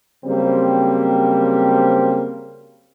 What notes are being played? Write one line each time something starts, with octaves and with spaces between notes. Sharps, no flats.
C#3 F#3 G3 A#3 C4